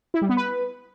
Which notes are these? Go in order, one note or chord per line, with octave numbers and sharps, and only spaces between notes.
E4
G3
B3
B4